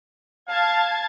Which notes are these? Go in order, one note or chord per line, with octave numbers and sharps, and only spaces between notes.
F5 A5 G#6 A6